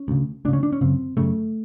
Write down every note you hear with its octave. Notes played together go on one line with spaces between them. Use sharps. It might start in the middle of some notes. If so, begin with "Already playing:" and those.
Already playing: C#4
D2 C#3
D2 C#3 C#4 D4
D4
C#4
F#2 C#3 C4
F#2 C#3 A3